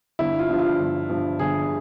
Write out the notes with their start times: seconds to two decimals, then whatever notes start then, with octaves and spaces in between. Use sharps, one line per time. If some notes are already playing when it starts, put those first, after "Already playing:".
0.19 G1 E4
0.39 F4
0.49 G2 F3
0.59 F4
0.79 G1
1.09 G2 F3
1.39 G1 G#4